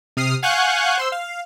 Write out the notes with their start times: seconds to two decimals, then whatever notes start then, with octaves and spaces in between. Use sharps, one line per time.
0.17 C3 D#6 F6 C7
0.42 F5 F#5 G#5 C#6 F#6 G6
0.97 C5 C6 E6
1.12 F5